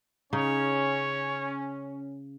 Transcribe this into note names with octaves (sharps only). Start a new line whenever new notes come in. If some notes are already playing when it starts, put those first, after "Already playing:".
C#3 C#4 D#4 C#5